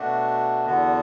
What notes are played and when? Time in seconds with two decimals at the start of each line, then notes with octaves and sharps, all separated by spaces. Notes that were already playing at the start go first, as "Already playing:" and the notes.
Already playing: B2 A3 D4 F#4
0.66 E2 D3 B3 F#4